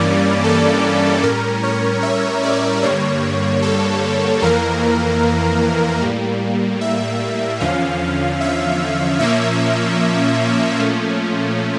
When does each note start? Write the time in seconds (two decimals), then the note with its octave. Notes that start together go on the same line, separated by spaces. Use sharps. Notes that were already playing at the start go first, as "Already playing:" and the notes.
Already playing: G2 E3 G3 A#3 C#4 D5
0.44 A4
1.23 A2 G3 C#4 A#4
1.63 C#5
2.03 E5
2.43 D5
2.83 G2 D3 G3 A#3 C#5
3.62 A4
4.42 F2 E3 A#3 A#4
6.02 A2 G3 A#3
6.81 E5
7.60 E2 D3 F3 C#4 F5
8.40 E5
9.19 A#2 F3 A#3 C#4 E5
10.80 A#2 F3 A3 C#4